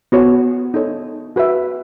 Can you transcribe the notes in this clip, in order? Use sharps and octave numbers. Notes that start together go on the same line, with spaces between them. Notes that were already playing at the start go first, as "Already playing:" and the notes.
B3 F#4 C#5
D#4 A4 C#5
F#4 B4 E5